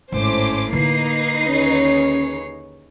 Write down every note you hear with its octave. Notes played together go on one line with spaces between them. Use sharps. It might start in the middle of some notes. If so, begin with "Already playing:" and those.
G#1 A2 C#4 C5 D6
D3 A#3 D#4 E4 B4 C7
D#2 C#3 C#4 C#5